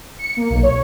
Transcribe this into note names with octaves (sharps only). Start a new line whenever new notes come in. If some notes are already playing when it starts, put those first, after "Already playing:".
C#7
A#3
B1
C#5